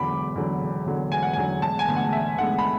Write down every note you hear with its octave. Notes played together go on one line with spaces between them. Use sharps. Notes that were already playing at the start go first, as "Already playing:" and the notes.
Already playing: E1 E2 D3 F#3 B5 D6
E1
E2 D3 F#3
E1
E2 D3 F#3
E1 G#5
F#5
E2 D3 F#3 G#5
E1 A5
G#5
D2 D3 G#3 B3
F#5
E1 E5
D2 D3 G#3 B3 F#5
B5